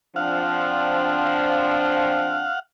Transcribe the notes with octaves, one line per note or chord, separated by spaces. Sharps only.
F3 C4 D4 F5 F#5